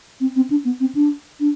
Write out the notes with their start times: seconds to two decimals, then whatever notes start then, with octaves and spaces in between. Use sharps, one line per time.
0.20 C4
0.36 C4
0.50 D4
0.65 B3
0.80 C4
0.95 D4
1.40 D4